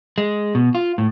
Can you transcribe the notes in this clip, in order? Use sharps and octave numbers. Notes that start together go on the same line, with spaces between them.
G#3
B2
F4
A2